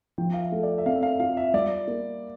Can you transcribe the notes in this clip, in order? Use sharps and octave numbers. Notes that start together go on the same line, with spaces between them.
F3 G5
F5
E5
A3
D5
E5
C4 F5
E5
F5
F4 F5
E5
G3 D5
A#3